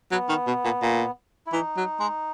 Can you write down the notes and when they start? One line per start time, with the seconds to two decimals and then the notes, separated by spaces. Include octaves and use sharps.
0.12 F#3 B3
0.29 D#3
0.47 B2
0.65 A#2
0.82 A#2
1.47 E4
1.53 E3 D#4
1.77 F#3
2.00 G#3